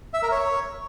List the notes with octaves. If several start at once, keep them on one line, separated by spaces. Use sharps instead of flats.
E5
A#4
C#5